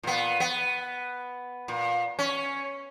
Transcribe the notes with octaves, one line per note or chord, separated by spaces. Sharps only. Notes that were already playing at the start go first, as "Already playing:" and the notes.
A#2 B3
B3
A#2
C#4